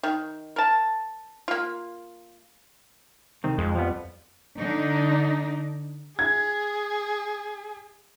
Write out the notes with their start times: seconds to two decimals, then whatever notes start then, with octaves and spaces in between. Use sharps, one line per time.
0.03 D#3
0.56 A#4 A5
1.48 A#3 F4
3.44 C2 D#3 C4
3.58 F2 G#3
3.75 F3 G3 B3
4.59 D3 D4 D#4
6.19 G#4 G#6